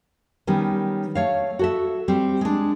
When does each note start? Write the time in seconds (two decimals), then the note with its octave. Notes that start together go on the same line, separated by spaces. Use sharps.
0.47 D#3 G3 B3 C#4
1.15 A3 C#5 F5
1.59 F#4 A4 E5
2.08 G3 C4
2.41 G#3 D4